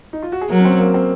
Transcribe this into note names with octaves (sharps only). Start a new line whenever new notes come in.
D#4
F4
F#4
G#4
F#3 A#4
C#4
C4
A#3
C4